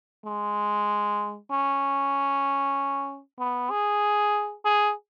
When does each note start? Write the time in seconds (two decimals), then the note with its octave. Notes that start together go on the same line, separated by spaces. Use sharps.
0.25 G#3
1.51 C#4
3.39 B3
3.70 G#4
4.65 G#4